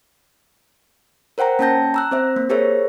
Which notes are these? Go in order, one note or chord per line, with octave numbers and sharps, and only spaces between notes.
A#4 C5 F#5 G5 A#5
A#3 C#4 G5 A5 G6 A#6
A#5 E6 F#6
C4 C5 E5
A#3
G4 G#4 A#4 C5 C#5 E5